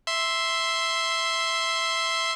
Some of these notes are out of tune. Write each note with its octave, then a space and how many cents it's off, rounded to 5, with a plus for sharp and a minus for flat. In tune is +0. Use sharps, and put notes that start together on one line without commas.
E5 +0 C6 +0